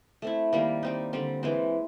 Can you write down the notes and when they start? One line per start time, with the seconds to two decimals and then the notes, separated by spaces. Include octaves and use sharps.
0.22 A3 C4 E4
0.53 D#3 G3 A#3
0.83 G3 C4 D#4
1.13 D3 G3 C4
1.43 E3 G#3 C4